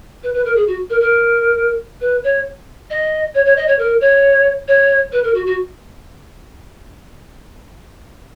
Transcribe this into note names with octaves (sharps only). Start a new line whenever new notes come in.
B4
B4
A#4
G#4
F#4
A#4
A#4
B4
C#5
D#5
C#5
C#5
D#5
C#5
A#4
C#5
C#5
B4
A#4
F#4
F#4